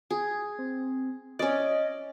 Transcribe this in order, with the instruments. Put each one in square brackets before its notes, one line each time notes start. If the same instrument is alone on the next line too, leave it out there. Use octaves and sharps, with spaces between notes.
[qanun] G#4
[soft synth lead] C4
[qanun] C#4 D5 [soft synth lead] D#5